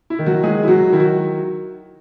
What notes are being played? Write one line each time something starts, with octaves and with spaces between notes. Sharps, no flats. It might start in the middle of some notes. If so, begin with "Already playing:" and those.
E4
D#3
F#3 F#4
F#3 G#3 G#4
E4
F#3 F#4
D#3 E4
F#4